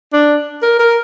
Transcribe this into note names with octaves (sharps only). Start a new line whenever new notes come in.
D4
A#4
A#4